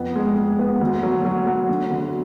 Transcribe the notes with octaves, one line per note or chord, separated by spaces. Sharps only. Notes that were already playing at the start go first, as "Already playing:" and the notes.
Already playing: F2 B3
G#3
G#3
B3
D2
F#3
F#3
F#3
D3
D2